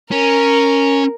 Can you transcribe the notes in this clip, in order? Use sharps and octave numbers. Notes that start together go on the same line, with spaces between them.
C#4 A#4